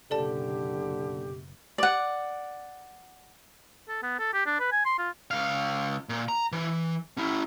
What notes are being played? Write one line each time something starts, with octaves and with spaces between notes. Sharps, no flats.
F#1 B2 D3 G4 A4 D5 A5
D5 F#5
A4
B3
A4
G4
D4
B4
G#5
C6
F4
C#2 F5
A#2
A#5
E3
C#4 E4